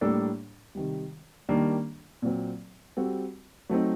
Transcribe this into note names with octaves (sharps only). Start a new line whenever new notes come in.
A2 G3 A#3 D4 A4
C3 D#3 G3
D#3 G3 A#3 D4
A#2 F#3 C4
G3 C4 F#4 A4
F#3 A3 C4 D#4